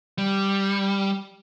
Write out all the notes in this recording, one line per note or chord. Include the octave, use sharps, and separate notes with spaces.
G3